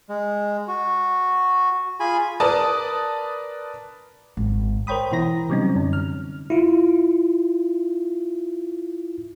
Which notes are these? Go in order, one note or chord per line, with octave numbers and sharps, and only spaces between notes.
G#3
F#4
F4 G#4 G#5 B5
A#4 B4 D5 A5 D#6
G#1
A#4 C5 C#5 G5 B5 D#6
B2 E3 E4 A#5 A#6
C3 F#3 G3 C4 C#4 D#4
F#2 D3
F6
E4 F4